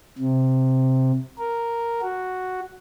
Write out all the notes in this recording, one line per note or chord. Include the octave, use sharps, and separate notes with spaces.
C3
A#4
F#4